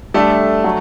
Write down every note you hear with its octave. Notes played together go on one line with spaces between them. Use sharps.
G3 A3 D4 A4 E5
F#3 A3